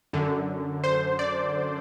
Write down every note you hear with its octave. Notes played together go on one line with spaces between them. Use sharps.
F#2 D3
C5
D5